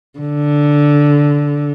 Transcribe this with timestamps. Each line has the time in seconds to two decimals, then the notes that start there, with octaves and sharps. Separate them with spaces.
0.19 D3